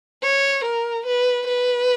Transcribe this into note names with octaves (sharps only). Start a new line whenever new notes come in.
C#5
A#4
B4
B4